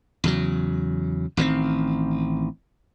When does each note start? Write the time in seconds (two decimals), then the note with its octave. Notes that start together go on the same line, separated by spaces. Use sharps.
0.24 E2 C#3 F#3
1.37 A1 D#3 F3 C4